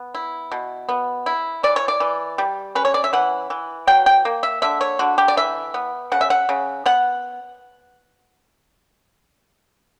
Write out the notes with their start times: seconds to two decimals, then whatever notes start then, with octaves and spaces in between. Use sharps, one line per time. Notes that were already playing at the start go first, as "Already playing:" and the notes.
Already playing: B3
0.14 E4
0.52 B2
0.89 B3
1.26 E4
1.63 E3 D5
1.76 C#5
1.88 D5
2.00 E3
2.38 G3
2.75 C#4 B4
2.85 C#5
2.94 D5
3.04 E5
3.13 E3 F#5
3.50 E3
3.87 F#3 G5
4.06 G5
4.25 A#3
4.43 E5
4.62 D3 E5
4.81 C#5
4.99 D3 F#4
5.18 G4
5.28 D5
5.37 E3 E5
5.74 B3
6.12 C#3 F#5
6.21 E5
6.30 F#5
6.49 C#3
6.86 B3 F#5